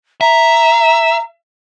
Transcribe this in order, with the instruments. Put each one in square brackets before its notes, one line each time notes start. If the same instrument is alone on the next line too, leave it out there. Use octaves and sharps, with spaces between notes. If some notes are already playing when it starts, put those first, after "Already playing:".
[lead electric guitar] E5 [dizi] A#5